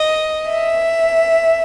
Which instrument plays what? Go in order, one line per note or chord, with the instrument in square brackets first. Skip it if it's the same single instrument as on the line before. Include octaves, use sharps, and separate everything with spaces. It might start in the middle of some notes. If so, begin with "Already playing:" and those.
Already playing: [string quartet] D#5
E5